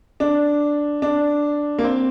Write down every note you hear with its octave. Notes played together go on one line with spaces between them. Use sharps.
D4
D4
A#3
C4